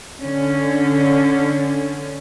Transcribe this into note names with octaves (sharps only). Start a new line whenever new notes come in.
D3 C#4